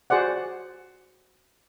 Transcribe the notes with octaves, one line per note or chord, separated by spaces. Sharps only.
F#4 G#4 C5 D5 F#5